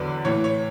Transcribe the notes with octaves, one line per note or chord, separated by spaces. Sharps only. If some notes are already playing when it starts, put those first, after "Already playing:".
Already playing: E2 D3 F#3 B4 D5
A2 E3 C#5
C#5